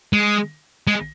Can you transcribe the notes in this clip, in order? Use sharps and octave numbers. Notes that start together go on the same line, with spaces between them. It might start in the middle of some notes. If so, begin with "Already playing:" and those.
G#3
G#3